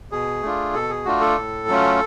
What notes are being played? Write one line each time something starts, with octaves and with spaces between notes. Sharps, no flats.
B2 G#4
A3 D4 F4
B2 A4
G#4
A3 D4 F4 F#4
A4
A2
F#3 A3 C#4 F4